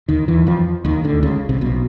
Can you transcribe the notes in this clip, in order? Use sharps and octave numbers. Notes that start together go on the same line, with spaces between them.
D#2 D#3
E2 E3
F2 F3
D#2 D#3
D2 D3
C#2 C#3
C2 C3
B1 B2